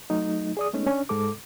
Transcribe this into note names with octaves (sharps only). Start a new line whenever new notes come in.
F#3 A3 D#4
G#4 D5 D#6
G#3 A3 B3 C#4 D#4
C#4 D4
G#2 G#3 A4 D6